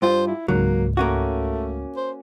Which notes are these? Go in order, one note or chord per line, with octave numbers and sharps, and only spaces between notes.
G2 F4 C5
E4
C#2 G#2 F#3 A#3
A3 A#3 C#4 F#4
C5